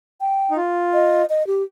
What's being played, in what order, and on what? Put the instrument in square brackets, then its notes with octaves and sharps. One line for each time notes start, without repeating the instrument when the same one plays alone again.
[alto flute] G5
[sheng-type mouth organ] D#4
F4
[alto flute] D#5
D#5
G4